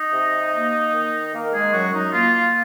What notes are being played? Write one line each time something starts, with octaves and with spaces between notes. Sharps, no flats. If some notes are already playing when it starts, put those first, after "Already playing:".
Already playing: D#4 D#5
C3
A#3
D#3
D#3 A#3 A#4
G#3 G#4
F#2 F#3 F#4
D#4
A#3 F4